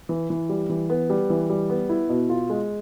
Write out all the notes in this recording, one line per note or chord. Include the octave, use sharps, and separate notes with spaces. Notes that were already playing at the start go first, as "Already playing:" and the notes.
E3
E3
G3
E3
B3
G3
E3
G3
B3
E4
B2
F4
G#3